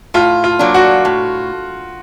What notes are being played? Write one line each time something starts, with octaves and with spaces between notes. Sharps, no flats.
A2 F4
F4
F#3 A#3 D4
F#4
A2